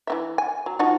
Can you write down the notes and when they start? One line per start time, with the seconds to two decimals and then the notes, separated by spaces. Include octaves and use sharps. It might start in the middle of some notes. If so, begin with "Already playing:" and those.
0.07 E3 C4 E5
0.38 G#5
0.66 F#3
0.79 F3 D#4 F#4